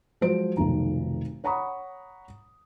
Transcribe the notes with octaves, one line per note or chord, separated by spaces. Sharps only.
F3 F#3 G#3 C5 D7
F1 B1 F2 D#3 A#5
C#5 F#5 A#5 B5 C#6 D#6